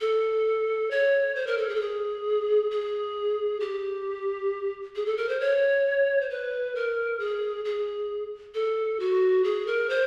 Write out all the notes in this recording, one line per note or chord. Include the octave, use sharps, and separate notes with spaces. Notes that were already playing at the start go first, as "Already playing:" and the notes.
A4
C#5
C5
A#4
A4
G#4
A4
G#4
G#4
G4
G#4
A4
A#4
C5
C#5
C5
B4
A#4
G#4
G#4
A4
F#4
G#4
A#4
C5